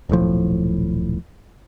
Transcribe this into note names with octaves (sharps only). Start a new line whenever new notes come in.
D#1 B1 A2 F3